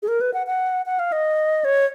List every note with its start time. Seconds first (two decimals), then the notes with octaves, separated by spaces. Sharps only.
0.03 G#4
0.08 A#4
0.21 B4
0.34 F#5
0.47 F#5
0.86 F#5
0.99 F5
1.12 D#5
1.65 C#5